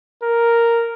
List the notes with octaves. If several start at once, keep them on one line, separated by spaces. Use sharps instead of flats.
A#4